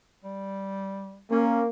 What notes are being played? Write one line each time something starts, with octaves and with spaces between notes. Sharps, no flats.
G3
A#3 C#4